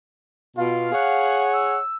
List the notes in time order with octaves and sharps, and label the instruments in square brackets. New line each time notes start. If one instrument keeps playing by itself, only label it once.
[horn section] B2 F4 [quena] F5
[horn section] G#4 C#5 F#5
[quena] E6